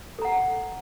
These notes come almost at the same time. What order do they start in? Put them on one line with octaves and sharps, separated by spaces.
A4 A#5 F#5